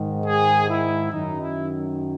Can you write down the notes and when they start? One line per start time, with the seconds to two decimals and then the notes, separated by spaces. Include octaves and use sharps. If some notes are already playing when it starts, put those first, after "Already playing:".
Already playing: G#2 D#3
0.24 G#4
0.67 E4
1.11 F#2 D#3 D#4
1.40 E4